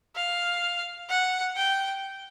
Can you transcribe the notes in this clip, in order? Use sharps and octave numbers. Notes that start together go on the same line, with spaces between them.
F5
F#5
G5